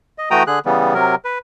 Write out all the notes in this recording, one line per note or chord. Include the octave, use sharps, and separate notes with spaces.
D#5
E3 A3 F#4 G5 A#5 D#6
D3 G#4 F#6
C#3 E3 G3 B3
C3 F#3 A#4
B4